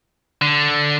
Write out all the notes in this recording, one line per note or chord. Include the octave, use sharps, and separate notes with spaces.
D3